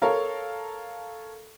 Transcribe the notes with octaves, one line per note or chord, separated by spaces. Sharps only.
A4 A#4 C#5 F5 A#5